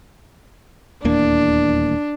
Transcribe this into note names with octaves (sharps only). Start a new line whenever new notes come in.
D#1 E2 A#3 D4